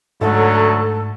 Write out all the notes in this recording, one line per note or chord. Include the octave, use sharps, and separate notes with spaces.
D2 G#2 F#3 A3 A4